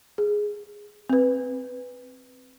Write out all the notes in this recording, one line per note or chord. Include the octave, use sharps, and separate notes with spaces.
G#4
C4 B4